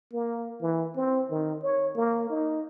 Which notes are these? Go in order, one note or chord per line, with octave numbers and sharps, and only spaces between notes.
A#3
E3
C4
D#3
C#5
A#3
D#4